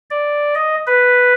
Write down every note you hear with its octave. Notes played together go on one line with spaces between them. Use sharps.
D5
D#5
B4